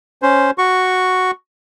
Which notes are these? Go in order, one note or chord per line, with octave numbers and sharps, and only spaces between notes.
C#4 C5
F#4 C#6